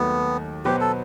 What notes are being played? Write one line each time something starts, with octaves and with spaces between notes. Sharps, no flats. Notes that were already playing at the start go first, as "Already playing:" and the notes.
Already playing: D#2 D#3 F#3 A3 B3
B2 F#3 B3 F#4 G4 C5
A4